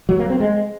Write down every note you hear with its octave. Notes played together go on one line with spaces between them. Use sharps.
F#3
A#3
C4
G#3